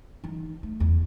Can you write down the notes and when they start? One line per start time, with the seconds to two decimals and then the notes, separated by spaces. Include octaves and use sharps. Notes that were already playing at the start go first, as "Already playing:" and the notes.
0.24 E3 D#4
0.63 A3
0.80 E2